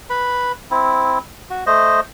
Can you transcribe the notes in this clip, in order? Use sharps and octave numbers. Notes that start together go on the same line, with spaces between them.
B4 B5
C4 E4
F#4
A3 C5 D#5